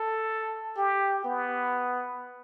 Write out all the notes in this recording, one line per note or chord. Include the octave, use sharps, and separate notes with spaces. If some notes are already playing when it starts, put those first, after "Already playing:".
Already playing: A4
G4
B3